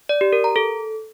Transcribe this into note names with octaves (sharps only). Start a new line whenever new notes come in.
D5
G4
A#4
A#5
A4